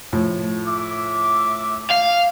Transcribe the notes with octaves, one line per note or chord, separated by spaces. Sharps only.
A2 F3
E5 D6
F5